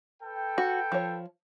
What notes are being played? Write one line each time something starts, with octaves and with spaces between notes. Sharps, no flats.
A4 B4 G5
F#4
F3 C#5